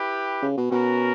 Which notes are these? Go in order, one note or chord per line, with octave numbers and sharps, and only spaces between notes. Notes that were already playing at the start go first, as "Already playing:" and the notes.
Already playing: E4 G4 B4
C#3
B2
B2 C#4 F#4 A#4